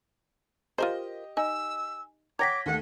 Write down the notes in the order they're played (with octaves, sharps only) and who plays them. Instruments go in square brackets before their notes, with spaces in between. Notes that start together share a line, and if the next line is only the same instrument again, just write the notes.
[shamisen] F4 A#4 C5 [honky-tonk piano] G4 D#5
[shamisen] D#4 [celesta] G#5 [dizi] E6
[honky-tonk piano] C#5 F#5 G5 [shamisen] A#5 [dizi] D6 [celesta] G#6 A#6 B6
[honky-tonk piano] D#2 A3 [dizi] F#5